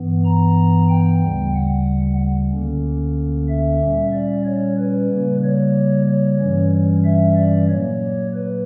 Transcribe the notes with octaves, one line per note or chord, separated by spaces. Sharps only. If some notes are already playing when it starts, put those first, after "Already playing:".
Already playing: G2 E3 B3
A#5
G5
D2 C#3 G3
F#5
D2 D3 A#3 C#4
E5
A#2 G3 C#4
D5
C#5
B4
C#3 G3 A#3
C#5
C#5
G2 E3 G3 C#4
E5
D5
A#2 F#3 A#3 C#5
B4